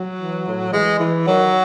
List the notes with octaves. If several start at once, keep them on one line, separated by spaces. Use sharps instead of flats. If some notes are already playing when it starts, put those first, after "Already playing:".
Already playing: F#3
E3
A2
E3 G#3
E3
D#3 F#3